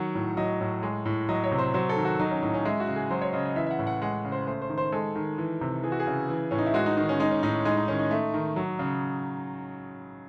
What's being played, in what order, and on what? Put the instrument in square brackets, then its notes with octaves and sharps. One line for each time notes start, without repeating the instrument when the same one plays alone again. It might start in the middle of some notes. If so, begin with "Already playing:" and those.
Already playing: [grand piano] D#3 F#3 F#5
A2
F#3 D#5
A2
G#3
A2
F#3 D#5
C#5
C3
C5
F#3 C5
A4
D#3
F#4
F#3 D#4
C#4
A2 D#4
C#4
G#3 E4
F#4
C#3
G#4
F#3 C5
C#5
C#3 D#5
D#5
E3 E5
E5
F#5
A2
F#5
G#3 F#5
C#3
C5
A3 C5
C5
D#3
C5
G#3 A4
D#3
E3
C3
E3 G#4
F#4
G#4
C#3
E3
A2 C#4
D#4
E4
G#3 F#4
D#4
D#3 D#4
C#4
G#3 D#4
C#4
A2 D#4
G#3 D#4
D#4
D#3 C#4
D#4
A3
D#3
F#3
C#3